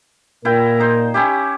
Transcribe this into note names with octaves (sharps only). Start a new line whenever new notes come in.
A#2 E4 A#4 G5
D#4 C5
C#4 E4 G4